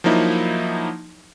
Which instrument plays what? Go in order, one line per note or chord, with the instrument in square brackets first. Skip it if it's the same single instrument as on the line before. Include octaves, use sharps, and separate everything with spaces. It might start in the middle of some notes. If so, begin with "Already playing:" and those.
[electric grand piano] F3 F#3 A#3 D#4 E4